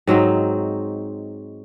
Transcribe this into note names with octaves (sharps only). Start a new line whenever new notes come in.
G#2 F#3 C4 D#4